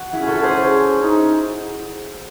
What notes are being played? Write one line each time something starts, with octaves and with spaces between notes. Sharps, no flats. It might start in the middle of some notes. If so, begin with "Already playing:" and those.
Already playing: F#4
C#4 E4 G#4
F#4 A4
G#4 C5
D#4